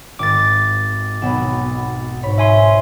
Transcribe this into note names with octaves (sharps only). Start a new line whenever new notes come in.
G#1 D6 A6
B1 B3 E7
G#2 C#5 B5
E5 G#5 C6